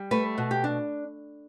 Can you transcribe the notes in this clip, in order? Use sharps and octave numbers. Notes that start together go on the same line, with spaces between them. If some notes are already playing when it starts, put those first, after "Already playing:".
Already playing: G3
A3 B4
B2
G4
D4